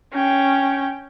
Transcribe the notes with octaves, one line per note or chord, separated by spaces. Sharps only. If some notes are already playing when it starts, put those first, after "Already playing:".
C#4 G5